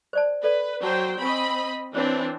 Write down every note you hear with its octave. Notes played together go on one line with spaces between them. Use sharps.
C5 D5 A5
A4 B4 D5
F#3 C5 G5 A5
C4 D#5 G#5 B5 C#6
E3 C4 D4 C5 C#5